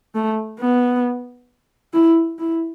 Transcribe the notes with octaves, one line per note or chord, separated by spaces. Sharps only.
A3
B3
E4
E4